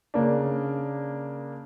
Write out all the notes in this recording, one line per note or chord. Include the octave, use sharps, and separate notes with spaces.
C#3 A#3 D4